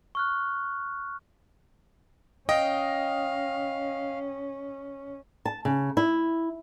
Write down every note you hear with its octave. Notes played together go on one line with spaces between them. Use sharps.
C#6 F6 F#6
C#4 D#5 F5 G5
A5
C#3
E4